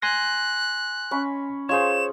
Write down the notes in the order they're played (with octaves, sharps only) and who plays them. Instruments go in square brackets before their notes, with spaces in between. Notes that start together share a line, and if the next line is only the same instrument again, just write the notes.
[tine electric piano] G#5 C6 A#6 [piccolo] F#6
[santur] C#4 B5
[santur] F4 G#4 [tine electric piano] C5 C#5 [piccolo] E7